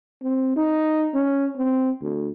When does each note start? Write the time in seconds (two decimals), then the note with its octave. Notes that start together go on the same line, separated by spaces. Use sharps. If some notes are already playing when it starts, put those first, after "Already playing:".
0.22 C4
0.56 D#4
1.14 C#4
1.57 C4
2.02 D2